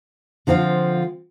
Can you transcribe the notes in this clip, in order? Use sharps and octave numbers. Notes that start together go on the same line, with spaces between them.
D3 F3 C4 F4